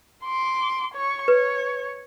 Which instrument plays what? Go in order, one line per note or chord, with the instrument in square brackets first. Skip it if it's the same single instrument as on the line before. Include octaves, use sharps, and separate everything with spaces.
[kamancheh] C6 D6
C#5 C#6
[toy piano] B4 [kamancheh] C#5